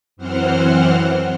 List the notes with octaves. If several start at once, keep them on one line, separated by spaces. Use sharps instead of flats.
F#2 E3 C4 C5 F#5 F6